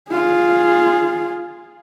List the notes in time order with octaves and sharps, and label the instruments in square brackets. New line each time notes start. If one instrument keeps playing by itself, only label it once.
[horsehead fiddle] F4 G#4